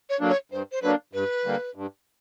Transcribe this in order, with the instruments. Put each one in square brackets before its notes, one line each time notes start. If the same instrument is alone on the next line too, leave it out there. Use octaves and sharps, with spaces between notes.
[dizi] C#5
[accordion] D3 F#3 A#3 D4
[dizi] C#5
[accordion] G2 [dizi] C5
[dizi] C5
[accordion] D3 F#3 A#3 D4 [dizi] B4
[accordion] G2 [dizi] B4
[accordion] D3 G3 A#3
G2